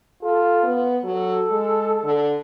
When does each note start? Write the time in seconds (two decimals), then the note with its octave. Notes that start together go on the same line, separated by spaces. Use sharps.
0.23 F4 A4
0.63 B3
1.04 F#3 A4
1.51 G#3
2.03 D3